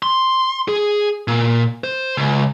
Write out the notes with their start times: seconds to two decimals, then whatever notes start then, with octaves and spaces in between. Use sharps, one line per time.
0.03 C6
0.68 G#4
1.28 A#2
1.84 C5
2.17 C#2